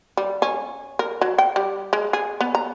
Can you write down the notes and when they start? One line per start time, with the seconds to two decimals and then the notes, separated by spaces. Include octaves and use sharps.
0.17 G3
0.42 C#4
0.99 A#4
1.21 F#3
1.38 G5
1.56 G3
1.93 G#3
2.13 G#4
2.41 B3
2.55 A#5